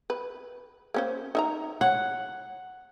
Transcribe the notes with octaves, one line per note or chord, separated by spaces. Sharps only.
B4
A#3 C#4 C5
D#4 E5 A#5
C#5 F#5